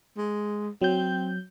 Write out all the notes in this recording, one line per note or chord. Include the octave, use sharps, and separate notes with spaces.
G#3
F#3 C4 G6